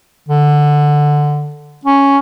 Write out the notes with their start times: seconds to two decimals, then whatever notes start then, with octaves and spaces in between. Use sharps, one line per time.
0.29 D3
1.85 C#4